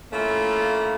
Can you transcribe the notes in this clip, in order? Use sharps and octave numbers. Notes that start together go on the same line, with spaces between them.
A3 A#3 C#4 E4 F4